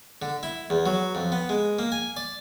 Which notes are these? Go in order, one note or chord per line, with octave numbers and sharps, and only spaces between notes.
D3
E4
E2
F#3
F2
B3
G#3
A#3
G#5
D5